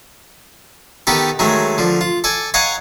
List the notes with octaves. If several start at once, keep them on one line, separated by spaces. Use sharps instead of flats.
D#3 B3 D#4 G4 A4
D#3 F#3 G#3 A3
D3 F3
F4
A4 D5 G#5
C#5 D#5 F5 F#5 G#5 A#5